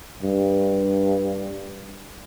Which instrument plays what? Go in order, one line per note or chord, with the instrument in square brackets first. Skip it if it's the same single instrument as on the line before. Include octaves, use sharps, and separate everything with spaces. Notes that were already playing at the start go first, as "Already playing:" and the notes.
[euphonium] G2